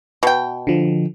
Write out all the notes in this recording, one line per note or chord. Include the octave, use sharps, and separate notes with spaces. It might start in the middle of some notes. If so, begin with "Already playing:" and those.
B2 G5
D3 F3